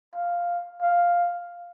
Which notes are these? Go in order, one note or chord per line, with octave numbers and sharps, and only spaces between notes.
F5
F5